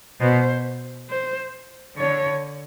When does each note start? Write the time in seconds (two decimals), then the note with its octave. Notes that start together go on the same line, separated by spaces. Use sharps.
0.21 B2 C5
1.10 C5
1.98 D3 C#5